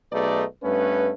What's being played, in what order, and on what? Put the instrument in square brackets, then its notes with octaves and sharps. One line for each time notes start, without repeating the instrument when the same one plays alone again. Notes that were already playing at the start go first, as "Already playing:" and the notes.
[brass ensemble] B1 A3 D#4 G#4 B4 D5
G2 A3 B3 C#4 B4